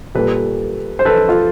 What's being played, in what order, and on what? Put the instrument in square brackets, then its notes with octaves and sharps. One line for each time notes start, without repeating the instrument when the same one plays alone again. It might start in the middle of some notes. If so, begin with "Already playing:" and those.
[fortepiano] A#2 G3 A4 B4
C5
A4 B4
F4